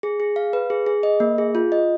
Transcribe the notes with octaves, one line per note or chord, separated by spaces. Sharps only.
G#4
G#4
F5
B4
G#4
G#4
D#5
A#3
G#4
F4
D#5